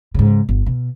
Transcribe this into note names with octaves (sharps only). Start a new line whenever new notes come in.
G#2 C#3
G1
B2